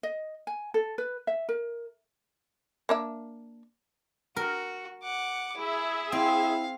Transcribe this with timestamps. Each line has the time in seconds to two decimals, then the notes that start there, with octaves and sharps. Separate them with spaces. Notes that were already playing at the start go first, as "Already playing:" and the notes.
0.03 D#5
0.47 G#5
0.74 A4
0.98 B4
1.27 E5
1.49 A#4
2.89 A#3 D4 E5
4.36 F#4 A#4
5.03 F#5 D6
5.57 E4 G#4 E5
6.12 C4 E4 F5